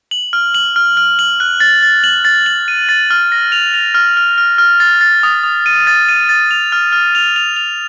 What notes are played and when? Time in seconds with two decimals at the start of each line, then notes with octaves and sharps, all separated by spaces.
0.11 F#7
0.33 F6
0.55 F#7
0.76 F6
0.97 F6
1.19 F#7
1.40 F#6
1.60 A6
1.83 A6
2.04 F#7
2.25 A6
2.46 F#7
2.68 D#7
2.89 A6
3.11 F6
3.32 A#6
3.52 F7
3.74 F7
3.94 F6
4.17 F6
4.38 F6
4.58 F6
4.80 A6
5.01 A6
5.23 D#6
5.43 D#6
5.66 D#7
5.87 A6
6.09 D#7
6.29 A6
6.51 F7
6.72 F6
6.92 F6
7.15 F7
7.36 F7
7.57 F7